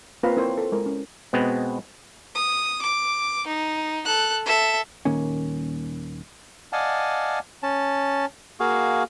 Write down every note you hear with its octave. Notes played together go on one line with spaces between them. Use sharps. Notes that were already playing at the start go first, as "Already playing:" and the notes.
A#3 C4 F4 B4 F5 A#5
C4 E4 A#4 C5 C#5
A4
G#3 E4 A#4
C#4
B2 G#3 B3 C4
D#6
D6
D#4
A4 F#6
A4 E5
D#1 D#3 A#3 C#4
D5 D#5 F5 F#5 G#5 A5
C#4 A5
A#3 F#4 G#4 F5